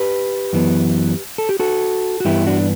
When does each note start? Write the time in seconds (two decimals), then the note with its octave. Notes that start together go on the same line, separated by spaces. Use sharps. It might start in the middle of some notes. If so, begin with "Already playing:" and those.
Already playing: G4 B4
0.53 F#2 E3 B3
1.38 A4
1.49 G4
1.60 F#4 A4
2.20 F#4
2.25 G2 E3 B3 E4 G4
2.47 D4 F#4